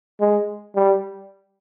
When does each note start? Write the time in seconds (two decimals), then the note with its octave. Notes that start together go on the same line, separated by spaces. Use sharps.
0.20 G#3
0.75 G3